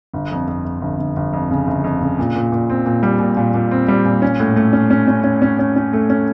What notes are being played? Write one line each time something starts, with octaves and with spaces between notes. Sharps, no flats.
G1
F2
F2
F2
G1
G1
G1
F2
C#3
G1
F2
C#3
A#2
A#2
A#2
C4
A#2
G3
A#2
A#2
A#2
C4
G3
A#2
C#4
A2
A3
C#4
C#4
C#4
C#4
C#4
C#4
C#4
A3
C#4